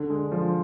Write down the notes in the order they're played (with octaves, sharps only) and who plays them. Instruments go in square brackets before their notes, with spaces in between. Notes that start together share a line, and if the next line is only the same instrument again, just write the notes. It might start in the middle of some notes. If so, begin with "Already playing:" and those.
Already playing: [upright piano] D3 [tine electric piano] D4
[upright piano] G#3
F3